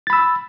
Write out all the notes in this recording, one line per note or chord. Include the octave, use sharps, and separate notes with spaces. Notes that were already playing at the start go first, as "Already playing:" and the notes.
B5 E6 A6